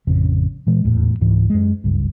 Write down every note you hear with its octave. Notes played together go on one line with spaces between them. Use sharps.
A1 F2 C#3
A#2 E3 G#3
D#1 E2 A2
C#2 G#2 E3
F#2 G#3
F#1 C#2 G2